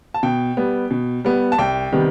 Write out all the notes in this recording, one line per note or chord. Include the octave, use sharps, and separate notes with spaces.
A5
B2 G5
G3 B3
B2
G3 B3
A5
C2 G5
C3 D#3 G3 B3